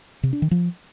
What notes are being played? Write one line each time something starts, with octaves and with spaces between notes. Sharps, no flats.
C3
D4
D#3
F3